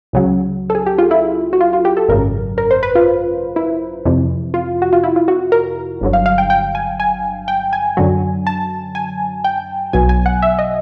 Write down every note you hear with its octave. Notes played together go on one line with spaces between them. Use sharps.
C#2 C#3 F#3
A4
G#4
G4
F4
E4
F#4
F4
F4
G4
A4
G#1 F#2 C#3 A#4
A#4
C5
B4
F4
E4
F2 C3 E3
F4
F#4
F4
E4
F4
F#4
A#4
G1 G2 D3 F#3
F5
F5
G5
G5
G#5
G#5
G5
G#5
F#2 D3 F#3
A5
G#5
G5
B1 B2 F#3 G#5
G#5
F#5
E5
D#5